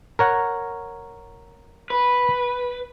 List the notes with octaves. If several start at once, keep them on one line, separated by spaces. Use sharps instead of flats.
A#4 C#5 F#5
B4